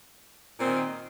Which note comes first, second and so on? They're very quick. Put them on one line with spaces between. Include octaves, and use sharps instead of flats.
A#2 C4 D#3